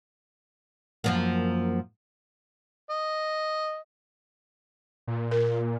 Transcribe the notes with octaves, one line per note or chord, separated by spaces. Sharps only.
F#2 F3 A#3
D#5
A#2
A#4